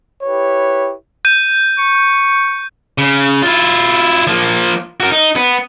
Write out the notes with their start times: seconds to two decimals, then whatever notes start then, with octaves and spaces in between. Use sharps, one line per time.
0.24 E4 G4 B4 C#5
1.25 G6 D#7
1.78 C#6
2.98 C#3
3.43 E4 F4
4.27 F3 A#3
5.00 F#4 A#4
5.11 D#4
5.36 B3